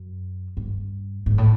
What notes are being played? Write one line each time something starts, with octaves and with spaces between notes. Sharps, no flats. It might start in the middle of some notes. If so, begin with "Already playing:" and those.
Already playing: F#2
G2
G#2
A2